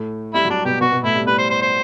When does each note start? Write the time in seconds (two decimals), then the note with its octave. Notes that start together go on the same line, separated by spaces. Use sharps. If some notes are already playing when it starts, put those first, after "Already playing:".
Already playing: A2 A3
0.34 G3 E4
0.45 F#3
0.50 G3 D4
0.65 B2 B3 G4
0.81 B2 B3 F#4
0.92 B2 B3
1.03 A2 A3 E4
1.15 G3
1.27 G3 B4
1.38 C5
1.50 C5
1.61 C5